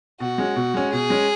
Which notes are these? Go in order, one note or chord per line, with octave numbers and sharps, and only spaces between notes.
B2 F#4
G#3 C#4
B2
G#3 C#4
B2 G#4
G#3 C#4